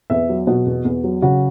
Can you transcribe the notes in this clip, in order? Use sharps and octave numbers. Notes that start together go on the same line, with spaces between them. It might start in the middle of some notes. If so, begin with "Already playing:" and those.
E2 E5
F#3
B2 F#4
E2
E2
F#3
C#3 F#4